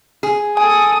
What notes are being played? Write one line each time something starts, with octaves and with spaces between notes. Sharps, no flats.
G#4
A4 G#5 D#6